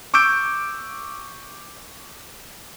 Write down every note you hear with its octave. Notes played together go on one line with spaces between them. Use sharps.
C#6 D6 E6 G6 D7